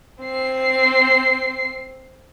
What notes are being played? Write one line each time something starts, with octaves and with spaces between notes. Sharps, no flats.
C4 C7